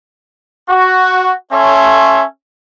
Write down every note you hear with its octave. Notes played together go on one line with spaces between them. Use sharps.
F#4
C#4 A4 C#5 E5 C6